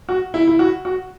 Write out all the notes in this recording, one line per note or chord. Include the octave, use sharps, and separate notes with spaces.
F#4
E4
E4
F#4
F#4